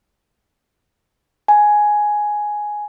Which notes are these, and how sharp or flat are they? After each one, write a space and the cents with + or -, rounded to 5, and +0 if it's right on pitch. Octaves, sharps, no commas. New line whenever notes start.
G#5 +5